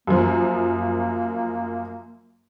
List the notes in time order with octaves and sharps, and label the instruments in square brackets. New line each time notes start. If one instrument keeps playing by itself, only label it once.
[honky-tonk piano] F#2 F3 [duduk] A#3